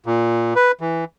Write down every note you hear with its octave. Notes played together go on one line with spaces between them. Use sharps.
A#2
B4
E3